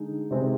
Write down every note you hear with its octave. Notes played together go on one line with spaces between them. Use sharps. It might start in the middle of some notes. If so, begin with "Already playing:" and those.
Already playing: D3 G#3 D#4
C3 D#3 G#3 C4